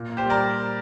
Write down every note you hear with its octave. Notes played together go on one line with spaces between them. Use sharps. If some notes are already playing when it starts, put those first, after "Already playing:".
Already playing: A#2
A#3
G4 C5
G3 A#4 D5